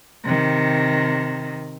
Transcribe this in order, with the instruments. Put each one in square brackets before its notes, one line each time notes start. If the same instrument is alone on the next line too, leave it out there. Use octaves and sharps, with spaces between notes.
[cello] C3 D#3